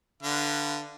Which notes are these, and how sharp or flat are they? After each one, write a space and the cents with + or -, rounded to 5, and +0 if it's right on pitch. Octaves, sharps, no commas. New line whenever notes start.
D3 +0 B4 -10 F5 -30